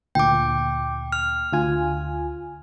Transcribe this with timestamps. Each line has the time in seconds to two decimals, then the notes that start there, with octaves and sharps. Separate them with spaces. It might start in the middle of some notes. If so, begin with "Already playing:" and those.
0.15 D2 A#2 G5 D6
1.12 F6
1.53 D2 F4 G#5